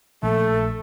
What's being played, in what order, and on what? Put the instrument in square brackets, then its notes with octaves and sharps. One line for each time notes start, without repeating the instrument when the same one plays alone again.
[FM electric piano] A#1 [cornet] A3 [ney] A4